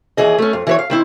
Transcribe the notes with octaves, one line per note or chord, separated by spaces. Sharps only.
D#2 E3 G#4 D#5
A3 C#4
F2
E3 B4 C#5
F5
D#3 C4 E4